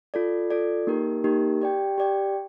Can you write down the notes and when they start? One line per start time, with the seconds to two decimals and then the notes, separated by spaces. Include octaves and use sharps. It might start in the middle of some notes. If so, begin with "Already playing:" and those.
0.14 F4 A4 D5
0.50 F4 A4 D5
0.87 A#3 D#4 G4 A#4
1.24 A#3 D#4 G4 A#4
1.62 G4 D5 G5
1.98 G4 D5 G5